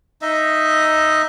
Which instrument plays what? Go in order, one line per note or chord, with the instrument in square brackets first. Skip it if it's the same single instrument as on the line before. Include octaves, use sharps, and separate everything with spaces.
[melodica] D#4 D#5 E5